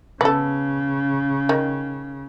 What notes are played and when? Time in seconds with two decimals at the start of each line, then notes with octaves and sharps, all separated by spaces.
0.21 C#3 B3 A4
1.49 D#3